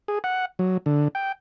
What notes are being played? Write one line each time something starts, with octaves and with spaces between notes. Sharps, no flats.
G#4
F#5
F#3
D3
G5